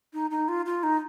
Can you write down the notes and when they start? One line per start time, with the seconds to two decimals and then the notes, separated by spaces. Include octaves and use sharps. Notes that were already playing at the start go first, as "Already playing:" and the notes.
0.13 D#4
0.31 D#4
0.48 F4
0.66 F4
0.83 D#4